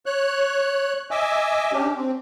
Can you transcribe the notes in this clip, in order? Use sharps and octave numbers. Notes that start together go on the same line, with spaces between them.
C#5 F#6
D#5 E5 G#5 D6 E6
C#4 D4 G4
C4